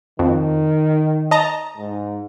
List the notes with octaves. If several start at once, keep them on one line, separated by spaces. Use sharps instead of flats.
F2 D#3
D#5 A5 A#5
G#2